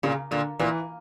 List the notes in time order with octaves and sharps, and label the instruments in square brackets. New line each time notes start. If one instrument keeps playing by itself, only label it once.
[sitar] A#2 [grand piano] C#3
[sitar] A#2 [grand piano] D3
[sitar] A#2 [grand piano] E3